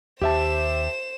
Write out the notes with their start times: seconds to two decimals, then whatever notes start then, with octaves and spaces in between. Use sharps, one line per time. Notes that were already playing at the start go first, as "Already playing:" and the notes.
0.22 D#2 G4 C5 E5 A5 E7